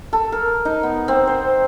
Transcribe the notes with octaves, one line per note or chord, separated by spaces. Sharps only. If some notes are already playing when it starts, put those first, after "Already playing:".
A4
A#4
D#4
B3
C4
C5